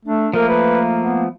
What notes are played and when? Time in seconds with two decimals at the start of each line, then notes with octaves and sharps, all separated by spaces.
0.05 A3 D4
0.34 F3 A3 A#3 A#4
0.49 B4
0.99 B3